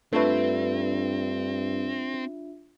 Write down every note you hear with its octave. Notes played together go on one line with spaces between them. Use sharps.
G2 A3 C4 D4 F4 B4 E5